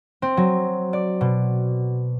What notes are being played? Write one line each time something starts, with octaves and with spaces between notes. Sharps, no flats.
C4
F#3
D5
B2